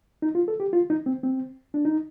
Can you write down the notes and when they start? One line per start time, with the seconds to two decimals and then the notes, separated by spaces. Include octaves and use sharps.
0.22 D#4
0.35 F4
0.48 A4
0.60 G4
0.73 F4
0.90 D#4
1.06 C4
1.23 C4
1.74 D4
1.85 D#4